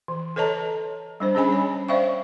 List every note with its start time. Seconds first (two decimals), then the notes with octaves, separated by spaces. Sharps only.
0.08 E3
0.36 A4 B4 C#5 D#5 A5 A#5
1.20 G3 D4 C5
1.35 C#4 D4 G#4 D#5 G#5 B5
1.49 G3 C#5
1.88 C5 D5 E5 F5 G5 C#6